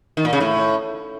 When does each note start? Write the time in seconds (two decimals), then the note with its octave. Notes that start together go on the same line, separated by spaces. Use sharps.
0.17 D#3
0.25 A#2
0.33 C#3
0.40 A2